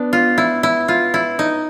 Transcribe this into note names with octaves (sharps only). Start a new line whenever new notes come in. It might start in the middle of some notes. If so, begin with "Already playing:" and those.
Already playing: B3 D4
F4
E4
E4
F4
E4
D#4